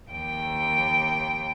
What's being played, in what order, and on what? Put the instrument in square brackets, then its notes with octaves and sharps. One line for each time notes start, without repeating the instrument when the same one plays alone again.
[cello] D#2 G5